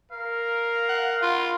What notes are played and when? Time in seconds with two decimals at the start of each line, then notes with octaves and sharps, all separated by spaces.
0.11 A#4 F5
0.89 F#5
1.22 F4